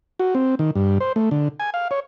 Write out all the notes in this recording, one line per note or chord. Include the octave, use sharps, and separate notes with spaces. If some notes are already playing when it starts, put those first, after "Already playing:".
F#4
C4
D#3
G2
C5
A3
D3
G#5
F5
C#5